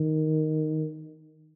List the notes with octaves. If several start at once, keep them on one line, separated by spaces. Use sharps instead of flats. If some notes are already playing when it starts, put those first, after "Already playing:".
Already playing: D#3